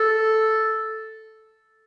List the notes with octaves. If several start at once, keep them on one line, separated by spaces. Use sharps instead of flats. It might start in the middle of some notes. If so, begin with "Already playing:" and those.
Already playing: A4